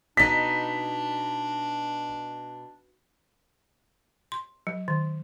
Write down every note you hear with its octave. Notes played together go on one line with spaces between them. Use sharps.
B2 D4 D#4 B6
C6
F#3
D#3